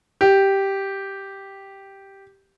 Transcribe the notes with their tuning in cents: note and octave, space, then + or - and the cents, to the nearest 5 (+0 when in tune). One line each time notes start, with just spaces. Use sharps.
G4 -5